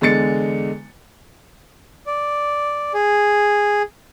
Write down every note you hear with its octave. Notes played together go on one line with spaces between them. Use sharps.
E2 D3 G#3 A6 C#7
D5
G#4